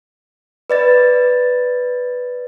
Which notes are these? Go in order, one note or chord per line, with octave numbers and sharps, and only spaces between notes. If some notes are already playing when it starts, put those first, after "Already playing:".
B4 D5 A6